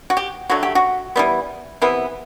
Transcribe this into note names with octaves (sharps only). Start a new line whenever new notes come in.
F#4
G4
D3 F#3 A3 F#4
G4
F#4
E3 G3 B3
C3 E3 B3